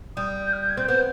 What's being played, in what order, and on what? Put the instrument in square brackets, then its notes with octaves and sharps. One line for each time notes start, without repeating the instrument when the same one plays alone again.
[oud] G3 [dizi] D#6
[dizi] G6
F6
G6
G#6
[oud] C4 [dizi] G6
[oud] B3 [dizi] G6